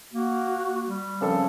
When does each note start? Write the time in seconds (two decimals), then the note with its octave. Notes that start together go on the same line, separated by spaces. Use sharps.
0.13 A#3 F#4
0.87 G3
1.21 C#3 F3 C4 D4 G#4 A4